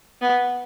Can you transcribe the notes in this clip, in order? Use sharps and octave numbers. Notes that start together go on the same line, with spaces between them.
B3